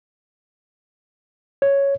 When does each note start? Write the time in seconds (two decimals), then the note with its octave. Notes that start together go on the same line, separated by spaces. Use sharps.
1.62 C#5